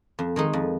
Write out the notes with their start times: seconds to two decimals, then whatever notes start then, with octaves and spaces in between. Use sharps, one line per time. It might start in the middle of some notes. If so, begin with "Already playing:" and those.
0.19 F2
0.36 D#3 G#3 D#4
0.53 F2